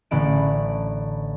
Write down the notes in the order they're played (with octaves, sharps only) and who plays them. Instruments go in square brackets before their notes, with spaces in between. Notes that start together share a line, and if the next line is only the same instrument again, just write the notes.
[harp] A1 A2 D3 B5 D7